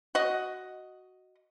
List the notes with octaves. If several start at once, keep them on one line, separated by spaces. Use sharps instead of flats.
F#4 D#5